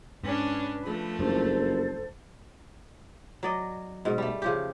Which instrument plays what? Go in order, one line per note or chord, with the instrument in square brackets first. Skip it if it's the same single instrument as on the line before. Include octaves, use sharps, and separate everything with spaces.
[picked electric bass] G#2 [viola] C#4 D4 [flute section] B4
[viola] F3 A3
[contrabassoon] F#1 [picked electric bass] G2 [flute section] A4 C5
[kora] F#3 D5 D#5
G#2 B2
G3 A3
C#3 F3 G4